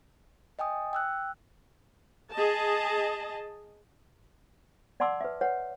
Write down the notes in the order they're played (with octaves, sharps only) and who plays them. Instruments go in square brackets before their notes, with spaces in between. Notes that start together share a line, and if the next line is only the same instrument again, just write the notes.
[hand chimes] D#5 G5 G#5 D#6
G5 E6 F#6
[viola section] G#4 D#5 A5
[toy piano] D5 F#5 A5 C6 D6 E6
B4 E5
B4 C#5 F#5